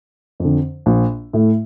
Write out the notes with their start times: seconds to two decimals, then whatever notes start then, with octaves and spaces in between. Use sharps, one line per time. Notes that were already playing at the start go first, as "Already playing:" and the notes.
0.40 F2 D3
0.86 A#1
1.33 A2 A3